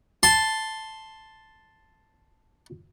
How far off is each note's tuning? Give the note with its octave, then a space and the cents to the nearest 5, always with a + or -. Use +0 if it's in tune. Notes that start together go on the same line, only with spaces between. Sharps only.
A5 +0 C6 +0